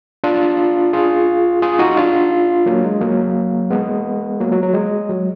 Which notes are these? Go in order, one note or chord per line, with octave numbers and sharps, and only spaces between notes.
D4 F4
F4 G#4
F4 G#4
D#4 F#4
D4 F4
F#3 A#3
G#3
F#3 A#3
G#3 B3
F#3 A#3
F#3
F#3
G#3
F#3